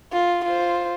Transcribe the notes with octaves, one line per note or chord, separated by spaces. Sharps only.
F4
F4 C5